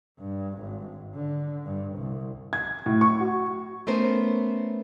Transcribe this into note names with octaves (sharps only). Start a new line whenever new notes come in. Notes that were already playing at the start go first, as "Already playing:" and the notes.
G2
G#1
D3
G2
C2
G#6
A2
C#6
F#4
A3 B3 C#4 A#4 C5